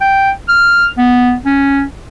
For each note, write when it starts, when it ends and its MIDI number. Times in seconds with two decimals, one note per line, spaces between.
0.01 0.30 79
0.48 0.88 89
0.98 1.34 59
1.45 1.83 61